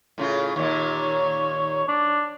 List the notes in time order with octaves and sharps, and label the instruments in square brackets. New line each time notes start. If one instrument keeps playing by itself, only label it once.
[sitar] A2 C#3 F4
[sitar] D#2 A#2 [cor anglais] C#5
[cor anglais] D4